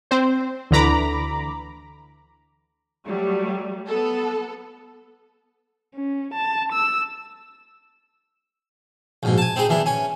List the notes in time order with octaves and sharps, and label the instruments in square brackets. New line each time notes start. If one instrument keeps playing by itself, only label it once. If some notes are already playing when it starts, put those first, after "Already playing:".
[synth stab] C4 C5
D2 D3 E3 A#5 B5 D6
[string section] F#3 G3 A3
B3 A4
[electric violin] C#4
A5
E6
[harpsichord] A#1 G#2 B2
G#5 A5
C4 D#4 G#4
E2 E3 D4
C#4 G#5